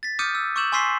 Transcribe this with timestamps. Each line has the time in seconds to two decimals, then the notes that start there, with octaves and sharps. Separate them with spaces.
0.03 A6 B6
0.19 D6 D#6 F6 G6 C#7 D#7
0.35 E6
0.56 C#6 D6 E6 G6 E7 F#7
0.72 G#5 C6 C#6 E6 B6 C7